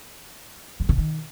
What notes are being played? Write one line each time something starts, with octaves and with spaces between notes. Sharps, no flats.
G2
C#3
D#3